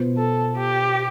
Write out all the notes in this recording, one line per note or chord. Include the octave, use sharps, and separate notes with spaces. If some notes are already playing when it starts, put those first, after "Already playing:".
Already playing: B2 B3 F4 C5
A4
G4